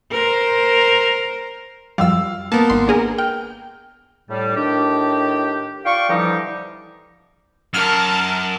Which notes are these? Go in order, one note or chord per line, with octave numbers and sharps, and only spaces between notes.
A#4 C5
F#2 F3 G3 F5 E6
A#3 B3 A5
G#1 C6
D4 G#4 A#4
G5 F6
A2 G3
A2 D#3 D4 G4
F4 D5 F5 G5 C#6
D3 E3 F3 G3 D#4 G4
F#2 A#4 A5 E6 F6